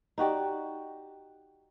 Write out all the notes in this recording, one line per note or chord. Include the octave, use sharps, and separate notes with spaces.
D#4 F#4 G4 D5